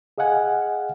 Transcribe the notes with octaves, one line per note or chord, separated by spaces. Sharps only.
G#4 D#5 F5 F#5 G#5